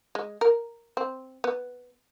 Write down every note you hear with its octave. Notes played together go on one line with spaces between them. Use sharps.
G#3
A#4
C4
B3